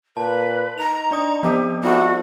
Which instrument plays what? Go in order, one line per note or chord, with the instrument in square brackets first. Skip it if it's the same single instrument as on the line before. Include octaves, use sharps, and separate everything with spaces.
[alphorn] A#2 [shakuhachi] B4 [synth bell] A5
[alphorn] D#4 [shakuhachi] A#5 [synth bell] F7
[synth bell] D4 D5 D#6
[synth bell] F3 B3 [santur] C4 D4 D#5 [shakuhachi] G4
[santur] F3 G3 A3 [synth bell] B3 [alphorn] D#4 [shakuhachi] F#4